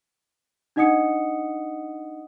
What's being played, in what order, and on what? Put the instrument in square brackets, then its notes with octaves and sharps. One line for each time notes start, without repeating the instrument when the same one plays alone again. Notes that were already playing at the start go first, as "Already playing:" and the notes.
[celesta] D4 D#4 D#5 F#5 D#6 C#7